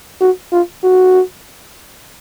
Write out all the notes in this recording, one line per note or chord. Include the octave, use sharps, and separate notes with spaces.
F#4
F4
F#4